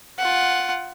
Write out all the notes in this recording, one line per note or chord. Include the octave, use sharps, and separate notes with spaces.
F4 F#5